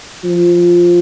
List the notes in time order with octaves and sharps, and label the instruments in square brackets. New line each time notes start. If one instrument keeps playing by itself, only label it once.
[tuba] F3